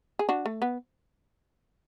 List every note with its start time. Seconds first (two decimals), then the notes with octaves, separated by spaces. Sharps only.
0.19 G#4
0.29 D4 F#4
0.46 A3
0.62 B3